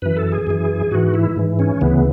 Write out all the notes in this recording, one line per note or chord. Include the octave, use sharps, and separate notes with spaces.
F#2 E3 B4
A4
G#4
F#2 E3
G#2 E3 F#4
E4
G#2 E3
C#4
D2 C#3 E3 B3